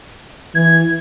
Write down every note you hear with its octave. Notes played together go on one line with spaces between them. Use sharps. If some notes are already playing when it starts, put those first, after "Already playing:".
E3 G#6